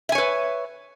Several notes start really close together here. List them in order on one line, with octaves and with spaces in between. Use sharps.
E5 G#5 C#5 B4